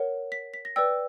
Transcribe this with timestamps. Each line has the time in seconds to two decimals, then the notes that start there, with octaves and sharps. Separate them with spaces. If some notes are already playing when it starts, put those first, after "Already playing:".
Already playing: A#4 C#5 F#5
0.32 B6
0.54 B6
0.65 A#6
0.76 B4 D5 G5 E6